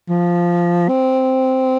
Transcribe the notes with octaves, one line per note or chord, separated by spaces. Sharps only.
F3
C4